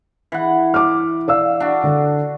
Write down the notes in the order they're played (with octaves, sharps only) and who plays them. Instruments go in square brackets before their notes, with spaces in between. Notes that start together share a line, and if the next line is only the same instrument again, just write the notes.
[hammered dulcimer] E3 F#5
[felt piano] D6 F6
D5 F5 E6
[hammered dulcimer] D4 F#4
[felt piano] D3